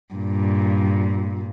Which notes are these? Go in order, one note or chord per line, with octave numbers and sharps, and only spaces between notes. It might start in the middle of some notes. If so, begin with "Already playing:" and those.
G2 A#2